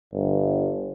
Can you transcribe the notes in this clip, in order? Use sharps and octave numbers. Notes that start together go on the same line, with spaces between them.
G1